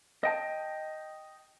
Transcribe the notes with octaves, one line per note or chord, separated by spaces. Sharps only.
D#5 G5 A5